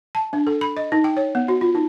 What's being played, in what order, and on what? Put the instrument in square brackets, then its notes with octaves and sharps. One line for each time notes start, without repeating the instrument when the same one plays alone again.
[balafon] A5
D4
A4
B5
D#5
D#4
G5
C#5
B3
F#4
F4
D#4